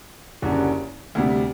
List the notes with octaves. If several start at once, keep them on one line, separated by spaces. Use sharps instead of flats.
F#1 F#2 D3 G3 D4
D2 C3 G3